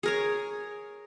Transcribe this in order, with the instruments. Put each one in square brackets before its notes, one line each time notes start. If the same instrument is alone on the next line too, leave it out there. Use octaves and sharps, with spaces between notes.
[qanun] G#4 A#4 C#5